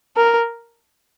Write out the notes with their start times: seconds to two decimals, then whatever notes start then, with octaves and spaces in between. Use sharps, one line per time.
0.17 A#4